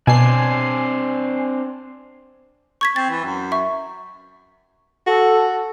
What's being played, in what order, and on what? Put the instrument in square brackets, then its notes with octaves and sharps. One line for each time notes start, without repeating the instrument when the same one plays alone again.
[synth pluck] B2 [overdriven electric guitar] C4 D4 [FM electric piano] G#5 C7
[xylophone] C#6 G#6 B6
[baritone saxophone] C4 [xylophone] A6
[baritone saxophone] E3
F#2
[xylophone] E5 C#6
[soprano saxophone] F#4 [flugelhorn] A4